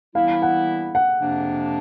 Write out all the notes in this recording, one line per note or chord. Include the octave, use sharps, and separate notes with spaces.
E3 G3 B3 E4 F5
F#5
F#5
F2 C3 F3 A#3 D4